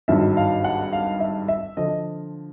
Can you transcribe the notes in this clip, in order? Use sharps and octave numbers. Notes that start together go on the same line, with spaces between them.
G#1 G2 D#3 F#3 E5
F5
F#5
F5
E5
E5
D3 F3 D#5